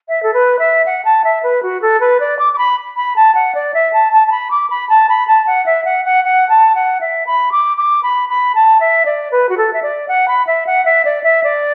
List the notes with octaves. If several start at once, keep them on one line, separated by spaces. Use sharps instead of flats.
E5
A4
B4
E5
F#5
A5
E5
B4
F#4
A4
B4
D5
D6
D6
B5
B5
A5
F#5
D5
E5
A5
A5
A5
B5
D6
B5
A5
B5
A5
F#5
E5
F#5
F#5
F#5
A5
F#5
E5
B5
D6
D6
B5
B5
A5
E5
D5
B4
F#4
A4
E5
D5
F#5
B5
E5
F#5
E5
D5
E5
D5